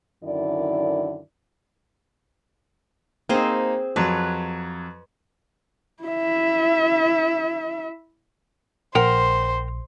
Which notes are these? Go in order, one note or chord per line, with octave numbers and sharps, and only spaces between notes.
F#2 D3 D#3 E4 D5
A#3 C4 D#4 G#4 C5
F2 F#3 B4
E4 E5
A#1 A#4 C5 F#5 G5